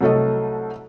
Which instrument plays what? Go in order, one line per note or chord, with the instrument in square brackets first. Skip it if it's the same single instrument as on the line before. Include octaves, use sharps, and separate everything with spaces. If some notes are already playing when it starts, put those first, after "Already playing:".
[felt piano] C2 F#3 A3 A4 D#5